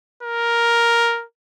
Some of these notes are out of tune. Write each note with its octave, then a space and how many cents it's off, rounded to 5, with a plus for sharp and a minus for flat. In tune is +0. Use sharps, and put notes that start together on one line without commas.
A#4 +5